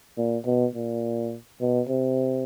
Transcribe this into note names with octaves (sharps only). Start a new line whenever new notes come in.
A#2
B2
A#2
B2
C3